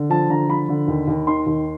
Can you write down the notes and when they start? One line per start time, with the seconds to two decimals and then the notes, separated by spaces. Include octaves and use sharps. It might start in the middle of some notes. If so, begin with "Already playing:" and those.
Already playing: D3
0.10 F3 A5
0.29 D3 A#5
0.49 F3 B5
0.68 D3
0.88 D#2
1.08 D#2
1.27 D#3 C6
1.46 D#2